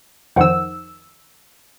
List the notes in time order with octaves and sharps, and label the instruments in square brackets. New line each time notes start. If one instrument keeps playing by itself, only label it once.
[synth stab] F2 D#3 E6 [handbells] C5 F#5 G5